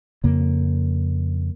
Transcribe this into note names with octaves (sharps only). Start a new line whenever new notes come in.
F2 C#3 A#3